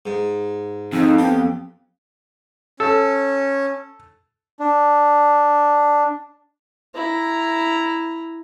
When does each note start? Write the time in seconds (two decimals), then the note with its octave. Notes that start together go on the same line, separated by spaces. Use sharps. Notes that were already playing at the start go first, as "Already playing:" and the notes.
0.06 G#2
0.93 F2 D#4
1.18 B3 G4
2.80 C#4 A4
4.60 D4
6.94 E4 A#5